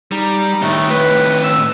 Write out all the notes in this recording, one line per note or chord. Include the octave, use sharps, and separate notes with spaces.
G3 D#4
A2 D#3 A3
B4
E6